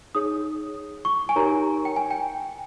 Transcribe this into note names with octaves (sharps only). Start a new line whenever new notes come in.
D#4 G#4 C#5 D#6
C#6
G#5
D#4 G4 A#4 C#5 A#5
G5
G#5
G5